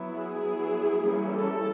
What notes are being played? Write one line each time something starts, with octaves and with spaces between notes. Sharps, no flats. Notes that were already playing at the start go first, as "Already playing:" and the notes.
Already playing: F#3 B3 E4
G#4
F#3 B3 E4
E3 G3 A#3 C#4 E4
A4